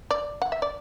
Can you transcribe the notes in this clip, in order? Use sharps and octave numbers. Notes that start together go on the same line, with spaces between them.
D5
F#5
E5
D5